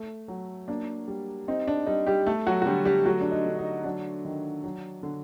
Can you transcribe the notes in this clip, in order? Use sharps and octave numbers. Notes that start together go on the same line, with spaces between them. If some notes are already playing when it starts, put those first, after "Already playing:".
Already playing: A3
F#3
A#3 D4
G3
C4 D#4
D4
G3 D#4
G3 G4
A3 A4
F#3 F#4
F#4
D3 G3 G4
G3 G4
F#3 A3 F#4
D4
D#4
D3
D#4
F#3 D4
D#3
F#3
D3